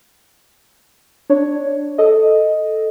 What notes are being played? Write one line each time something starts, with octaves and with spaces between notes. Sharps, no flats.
D4 C#5
A4 D#5